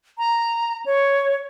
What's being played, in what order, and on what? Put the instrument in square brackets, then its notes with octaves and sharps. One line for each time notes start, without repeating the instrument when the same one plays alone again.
[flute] A#5
C#5